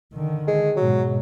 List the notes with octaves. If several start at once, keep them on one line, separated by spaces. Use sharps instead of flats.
D3 D#3
G#3
G#2 B2 F#3